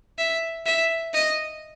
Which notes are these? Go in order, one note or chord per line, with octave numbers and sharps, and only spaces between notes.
E5
E5
D#5